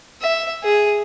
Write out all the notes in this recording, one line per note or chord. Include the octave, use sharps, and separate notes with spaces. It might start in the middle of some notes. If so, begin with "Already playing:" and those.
E5
G#4